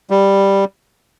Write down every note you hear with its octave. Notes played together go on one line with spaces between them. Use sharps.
G3